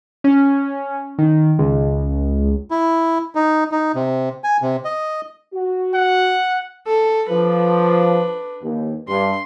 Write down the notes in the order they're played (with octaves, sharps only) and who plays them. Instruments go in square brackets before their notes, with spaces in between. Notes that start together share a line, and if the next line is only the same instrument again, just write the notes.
[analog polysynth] C#4
D#3
C#2
[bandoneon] E4
D#4
D#4
C3
G#5
C3
D#5
[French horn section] F#4
[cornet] F#5
[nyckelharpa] A4
[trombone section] F3 [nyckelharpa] D4 B4
[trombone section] D#2
[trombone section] G2 [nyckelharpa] C6